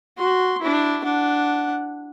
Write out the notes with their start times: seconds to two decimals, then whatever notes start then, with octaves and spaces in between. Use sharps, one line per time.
0.18 F#4 C6
0.62 D4 E4
1.04 D4 F#5